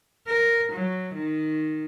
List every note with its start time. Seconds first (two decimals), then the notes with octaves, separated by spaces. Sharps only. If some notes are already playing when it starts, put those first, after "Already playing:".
0.25 A#4
0.70 F#3
1.13 D#3